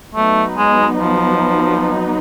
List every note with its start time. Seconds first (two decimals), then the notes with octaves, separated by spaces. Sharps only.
0.15 F#3 A3 B3 D#4
0.58 G#3
0.99 F3